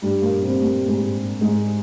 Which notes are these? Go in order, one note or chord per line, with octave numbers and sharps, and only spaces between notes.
G2 G3
A#2 A#3
C3 C4
A#2 A#3
G#2 G#3
G#2 G#3